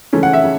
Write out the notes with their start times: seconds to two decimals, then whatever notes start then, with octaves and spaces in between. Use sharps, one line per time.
0.13 C#3 E3 A3 C#4
0.23 F#5
0.33 E5
0.44 C#3